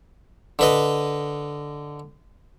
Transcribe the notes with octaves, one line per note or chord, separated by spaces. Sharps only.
D3 B4 D#5